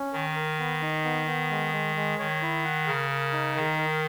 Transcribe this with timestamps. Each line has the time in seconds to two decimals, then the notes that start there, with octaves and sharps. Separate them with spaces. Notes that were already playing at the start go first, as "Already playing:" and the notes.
Already playing: C#4
0.13 D#3 A#4
0.36 A#4
0.59 B3
0.82 D#4
1.05 B3
1.27 B3
1.51 G#3
1.73 G#3
1.96 G#3
2.19 D#3 C#5
2.41 E4
2.64 F#5
2.87 C#3 A#4
3.10 A#4
3.32 D#4
3.55 D#3 A#4
3.78 A#4